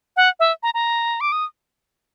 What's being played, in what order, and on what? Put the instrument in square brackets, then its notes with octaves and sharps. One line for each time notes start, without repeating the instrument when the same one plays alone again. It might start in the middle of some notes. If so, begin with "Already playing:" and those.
[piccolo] F#5
E5
A#5
A#5
D6
D#6